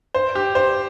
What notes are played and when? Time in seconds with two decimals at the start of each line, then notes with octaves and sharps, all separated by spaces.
0.15 C5
0.35 G4
0.55 C5